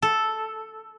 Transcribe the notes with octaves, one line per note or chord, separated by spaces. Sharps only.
A4